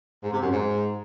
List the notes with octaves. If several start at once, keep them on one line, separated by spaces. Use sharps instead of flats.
G#2
C3
F#2
G#2